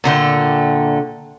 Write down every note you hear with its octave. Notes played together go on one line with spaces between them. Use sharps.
A#2 D3 A3 G5